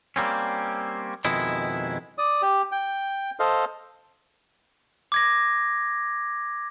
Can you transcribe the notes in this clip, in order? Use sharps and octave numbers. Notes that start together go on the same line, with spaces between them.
G3 A#3 C4 C#4
F2 B2 D#3 G#3 E4
D5 D#6
G4
G5
A4 C5 D#5 F5
D6 G#6 A#6